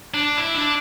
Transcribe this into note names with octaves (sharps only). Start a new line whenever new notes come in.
D4
E4
D4